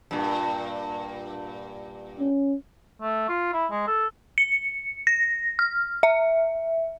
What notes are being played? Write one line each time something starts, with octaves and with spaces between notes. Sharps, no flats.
G2 A#2
C#4
A3
F4
E4
G#3
A4
C#7
A#6
F6
E5